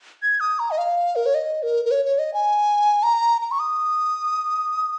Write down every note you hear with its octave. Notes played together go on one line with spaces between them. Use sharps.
G#6
D#6
A#5
D#5
F5
A#4
C#5
D#5
A#4
A#4
C#5
C#5
D#5
G#5
A#5
A#5
C#6
D#6